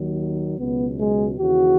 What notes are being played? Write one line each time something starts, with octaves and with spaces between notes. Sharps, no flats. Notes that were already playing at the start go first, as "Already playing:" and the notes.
Already playing: D#2 D#3 F#3
C#2 B2 F#3 B3
G#3
D#2 C#3 E3 F#4